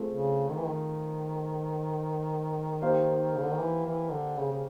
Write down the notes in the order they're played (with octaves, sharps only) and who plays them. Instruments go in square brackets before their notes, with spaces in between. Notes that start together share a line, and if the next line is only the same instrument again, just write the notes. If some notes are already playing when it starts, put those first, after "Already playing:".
Already playing: [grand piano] A3 C4 F4 G#4 C5
[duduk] C#3
D#3
E3
D#3
[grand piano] A#3 D#4 G4 C5 F5
[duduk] C#3
D3
D#3
E3
E3
D3
C#3
C#3